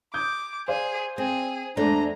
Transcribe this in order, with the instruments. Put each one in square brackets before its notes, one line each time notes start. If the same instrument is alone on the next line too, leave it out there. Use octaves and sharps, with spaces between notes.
[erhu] D6 [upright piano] D#6 G6 G#6
[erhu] G#4 [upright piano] C5 D5 F5
[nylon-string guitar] C4 [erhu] G#4
[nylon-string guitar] E2 G#3 A3 [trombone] D4 [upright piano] C5 [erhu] A#5